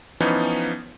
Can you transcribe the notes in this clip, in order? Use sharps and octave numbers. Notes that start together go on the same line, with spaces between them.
E3 F3 B3 C#4 D#4